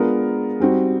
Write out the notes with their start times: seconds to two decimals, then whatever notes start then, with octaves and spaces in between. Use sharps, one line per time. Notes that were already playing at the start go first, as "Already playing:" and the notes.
Already playing: G#3 B3 D4 F4 A#4
0.60 G3 C4 D#4 F#4